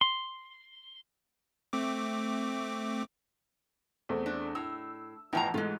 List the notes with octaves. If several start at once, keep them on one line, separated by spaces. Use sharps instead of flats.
C6
A3 C4 D6
E2 A3 C4
D4
A2 E6
A1 B2 F3 E4 G5 A#5
G#2 E3 G#3 A3 F4